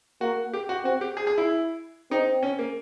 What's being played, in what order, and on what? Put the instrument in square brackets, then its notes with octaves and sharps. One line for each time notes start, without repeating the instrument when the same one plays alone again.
[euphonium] A#3 [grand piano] F#4
[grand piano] G4
F#4
[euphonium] C4 [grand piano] F#4
[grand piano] G4
G#4
G#4
E4
[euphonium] C4 [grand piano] D#4
[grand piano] C#4
A#3